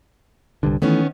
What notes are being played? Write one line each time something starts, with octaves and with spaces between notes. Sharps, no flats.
C2 G2 D3
D#3 E3 A3 B3 C#4